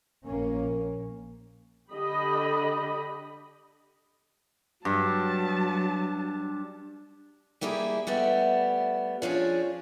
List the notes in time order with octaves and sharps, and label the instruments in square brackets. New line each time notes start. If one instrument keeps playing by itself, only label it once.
[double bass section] A#1 A#3 C#4
[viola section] D3 G4 D#5 B5
[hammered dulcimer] G2 [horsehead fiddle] F#3 A5
[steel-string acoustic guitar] G3 A#3 E4 G4 G#4
G3 A3 B3 E5
F3 C#4 D4 G#4